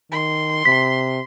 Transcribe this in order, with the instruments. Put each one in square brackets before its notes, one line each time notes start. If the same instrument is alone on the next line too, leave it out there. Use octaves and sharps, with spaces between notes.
[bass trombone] D#3 [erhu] C6
[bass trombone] C3 [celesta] B6